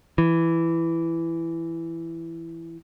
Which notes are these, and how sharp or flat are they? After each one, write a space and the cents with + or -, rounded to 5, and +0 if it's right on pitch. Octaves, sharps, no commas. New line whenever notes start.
E3 +10